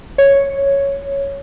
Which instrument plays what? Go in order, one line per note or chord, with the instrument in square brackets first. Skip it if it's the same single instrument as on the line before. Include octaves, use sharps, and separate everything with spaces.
[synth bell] C#5